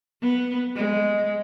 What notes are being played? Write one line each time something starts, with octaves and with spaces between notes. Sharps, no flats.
B3
G#3